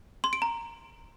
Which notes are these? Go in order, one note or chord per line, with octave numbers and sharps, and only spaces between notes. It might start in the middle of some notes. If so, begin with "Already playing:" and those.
C6
D7
A#5